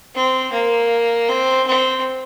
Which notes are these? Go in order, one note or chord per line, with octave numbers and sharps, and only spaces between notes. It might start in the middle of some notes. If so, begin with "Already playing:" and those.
C4
A#3
C4
C4